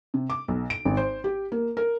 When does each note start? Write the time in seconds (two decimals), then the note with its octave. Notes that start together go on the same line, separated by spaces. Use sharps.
0.14 C3
0.30 D6
0.48 B1
0.70 D7
0.86 G#1
0.97 C5
1.24 G4
1.52 A#3
1.77 A#4